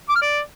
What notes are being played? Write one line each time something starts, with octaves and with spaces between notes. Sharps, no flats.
D6
F6
D5